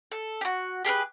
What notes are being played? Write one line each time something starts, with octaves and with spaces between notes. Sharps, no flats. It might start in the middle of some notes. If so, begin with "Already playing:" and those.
A4
F#4 G4
G4 G#4 A#4 B4